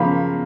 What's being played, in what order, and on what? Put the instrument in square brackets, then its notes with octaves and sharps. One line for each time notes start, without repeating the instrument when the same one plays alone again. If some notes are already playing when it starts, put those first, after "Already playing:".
Already playing: [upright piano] C#3 F3 A#3 B5